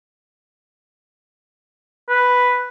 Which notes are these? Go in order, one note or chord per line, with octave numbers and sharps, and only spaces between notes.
B4